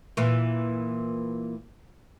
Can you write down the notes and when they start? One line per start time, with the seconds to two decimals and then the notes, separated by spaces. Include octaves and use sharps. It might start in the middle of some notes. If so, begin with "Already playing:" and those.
0.17 A#2 E3